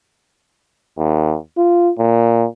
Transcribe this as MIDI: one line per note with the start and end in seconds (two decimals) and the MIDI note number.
0.98 1.37 39
1.58 1.92 65
1.99 2.46 46